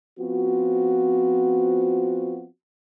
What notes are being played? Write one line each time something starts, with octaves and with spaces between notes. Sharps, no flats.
F3 B3 C4 F4 F#4